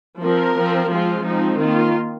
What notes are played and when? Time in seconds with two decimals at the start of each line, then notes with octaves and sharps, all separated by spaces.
0.23 F3 C4 A#4
0.57 F3 C4
0.91 F3 G#3 C4 F4
1.25 F3 G#3 C4 D#4
1.60 D#3 A#3 F4